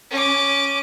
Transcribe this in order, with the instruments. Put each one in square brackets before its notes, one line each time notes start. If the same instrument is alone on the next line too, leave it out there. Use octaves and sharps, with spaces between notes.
[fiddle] C#4 D6